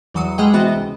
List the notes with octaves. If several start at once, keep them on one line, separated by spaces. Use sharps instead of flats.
E2 E3 F#3 D#6 C#7
G3 G#3 G#4 D#5 F#5 G5
C3 E3 B3 F#4 D#5
C#2